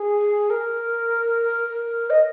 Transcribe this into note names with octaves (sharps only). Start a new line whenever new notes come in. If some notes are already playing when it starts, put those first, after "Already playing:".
Already playing: G#4
A#4
D#5